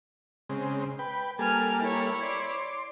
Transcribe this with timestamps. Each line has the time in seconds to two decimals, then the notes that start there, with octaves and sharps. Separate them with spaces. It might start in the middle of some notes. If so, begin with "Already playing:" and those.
0.50 C#3 G#3 C4
0.99 B4 G5
1.39 G3 A#3 A4 G#5 F6
1.80 E4 C#5
2.23 D5 C6